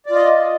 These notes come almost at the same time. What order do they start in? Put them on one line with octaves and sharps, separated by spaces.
D5 F4 D#5